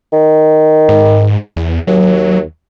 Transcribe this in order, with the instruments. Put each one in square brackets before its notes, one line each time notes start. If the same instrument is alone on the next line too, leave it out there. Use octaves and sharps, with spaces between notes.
[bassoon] D#3
[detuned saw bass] G#2
E2
[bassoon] D#2 [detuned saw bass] F#3